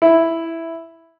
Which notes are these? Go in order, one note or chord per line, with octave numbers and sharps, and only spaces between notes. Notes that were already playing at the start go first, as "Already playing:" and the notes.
E4